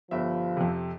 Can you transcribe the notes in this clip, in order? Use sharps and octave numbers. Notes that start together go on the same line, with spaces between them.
G1 F3 G3 E5
F2 C3